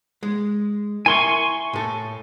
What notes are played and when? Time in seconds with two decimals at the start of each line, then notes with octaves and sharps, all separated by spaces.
0.23 G#3
1.06 E4 A#4 G#5 C6 C#6
1.73 A2 A4